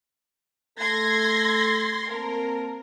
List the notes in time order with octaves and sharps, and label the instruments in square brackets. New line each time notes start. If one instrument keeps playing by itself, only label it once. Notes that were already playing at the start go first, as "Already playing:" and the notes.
[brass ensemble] A3 A4 [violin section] C6 G#6 A#6
[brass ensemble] A#3 C4 A5 [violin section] A#4